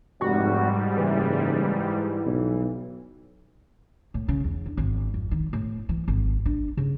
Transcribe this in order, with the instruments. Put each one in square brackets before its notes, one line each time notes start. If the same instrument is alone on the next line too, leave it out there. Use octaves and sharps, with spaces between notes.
[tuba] F1 [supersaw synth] G#2 G3 [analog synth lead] F#4
[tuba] F#1 [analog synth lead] E3
[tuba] B1
[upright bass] A2
C#3
E2
D3
G#1
F2
D#3
A2
E3
G#1
D4
C#3